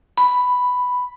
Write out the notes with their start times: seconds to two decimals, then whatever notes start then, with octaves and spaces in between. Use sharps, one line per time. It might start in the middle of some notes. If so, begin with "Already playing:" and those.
0.18 B5